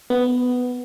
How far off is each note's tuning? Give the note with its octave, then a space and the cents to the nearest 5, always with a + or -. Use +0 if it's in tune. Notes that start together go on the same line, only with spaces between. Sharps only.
B3 +5